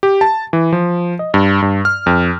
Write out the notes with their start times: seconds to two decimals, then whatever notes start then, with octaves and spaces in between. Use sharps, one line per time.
0.03 G4
0.21 A5
0.53 E3
0.73 F3
1.19 D#5
1.34 G2
1.62 G2
1.85 F6
2.06 F2